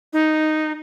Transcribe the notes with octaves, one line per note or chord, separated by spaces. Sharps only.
D#4